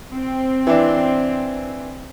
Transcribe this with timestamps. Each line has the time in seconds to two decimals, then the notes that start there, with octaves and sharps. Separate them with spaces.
0.13 C4
0.67 E3 D4